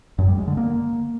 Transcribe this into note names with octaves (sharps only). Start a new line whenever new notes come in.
F#2
G3
G#3
D3
A#3